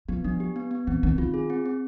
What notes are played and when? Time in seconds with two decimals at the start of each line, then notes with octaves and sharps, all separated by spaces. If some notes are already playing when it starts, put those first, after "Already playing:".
0.09 F3 B3
0.24 F3 D4
0.40 G4
0.56 B3
0.71 B3
0.87 E3 C4
1.03 D#3 C4
1.18 D#3 F4
1.34 G#4
1.50 C4
1.66 C4